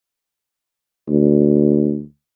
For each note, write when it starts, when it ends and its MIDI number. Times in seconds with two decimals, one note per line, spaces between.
1.09 2.02 38